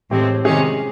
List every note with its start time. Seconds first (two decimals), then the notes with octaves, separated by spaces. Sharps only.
0.11 A2 E3 G#3 C4 G4
0.44 C3 D#3 G#3 C#4 G#4